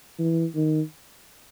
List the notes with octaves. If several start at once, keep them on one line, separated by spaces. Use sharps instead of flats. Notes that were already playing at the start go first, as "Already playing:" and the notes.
E3
D#3